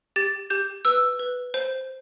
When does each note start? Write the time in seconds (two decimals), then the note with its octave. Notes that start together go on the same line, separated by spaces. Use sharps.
0.16 G4 A6
0.50 G4 G6
0.85 B4 E6
1.19 B4
1.54 C5